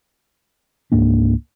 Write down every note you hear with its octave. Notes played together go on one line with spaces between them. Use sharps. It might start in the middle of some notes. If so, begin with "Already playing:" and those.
C#2 G#2 A#3 D4